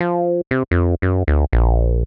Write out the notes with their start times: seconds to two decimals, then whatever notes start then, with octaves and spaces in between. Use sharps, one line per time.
0.01 F3
0.51 C3
0.71 F2
1.02 F#2
1.27 D2
1.53 A#1